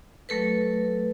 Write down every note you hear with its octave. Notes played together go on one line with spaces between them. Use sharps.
F#3 A3 A4 B4